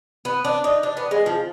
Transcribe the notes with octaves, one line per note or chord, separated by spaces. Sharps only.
B3
D4
D#4
D4
B3
G#3
F3